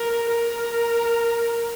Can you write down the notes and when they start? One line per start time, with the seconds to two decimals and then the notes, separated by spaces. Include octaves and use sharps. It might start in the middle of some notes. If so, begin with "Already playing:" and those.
Already playing: A#4
0.31 A#4